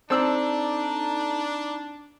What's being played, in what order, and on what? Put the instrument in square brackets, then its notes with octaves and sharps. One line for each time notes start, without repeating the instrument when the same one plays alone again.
[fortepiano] C4 E6 [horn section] D4 [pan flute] D#4 [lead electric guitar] A4 D5